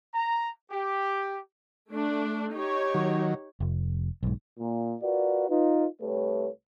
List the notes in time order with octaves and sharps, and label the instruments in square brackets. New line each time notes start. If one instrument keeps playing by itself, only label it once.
[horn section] A#5
G4
[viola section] A3 D4
D#4 G4 C#5
[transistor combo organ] D#3 F#3
[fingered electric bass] F1
B1 G#2
[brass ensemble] A#2
F4 F#4 A#4 B4 D5
D#4 F4 B4
C2 A3 G4 B4 C#5